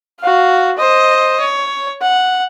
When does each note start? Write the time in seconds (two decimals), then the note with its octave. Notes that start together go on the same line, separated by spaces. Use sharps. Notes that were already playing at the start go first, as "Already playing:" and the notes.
0.20 F#4 F5
0.77 C5 D#5
1.40 C#5
2.02 F#5